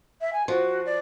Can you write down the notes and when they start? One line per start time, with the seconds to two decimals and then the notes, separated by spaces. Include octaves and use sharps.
0.21 E5
0.33 G#5
0.48 F3 F#4
0.86 D5